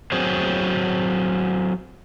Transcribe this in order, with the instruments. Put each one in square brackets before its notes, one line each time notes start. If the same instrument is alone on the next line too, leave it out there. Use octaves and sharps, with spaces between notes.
[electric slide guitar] F#3 C4 F#4 G#4 C5 C#5